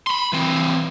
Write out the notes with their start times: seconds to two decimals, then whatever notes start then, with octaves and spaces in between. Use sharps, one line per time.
0.07 B5 C6
0.33 E3 C4